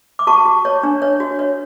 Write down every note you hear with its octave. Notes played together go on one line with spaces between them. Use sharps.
D6
F#4 A5 C#6
F#4
C#5
D4
C#5
F#4
C#5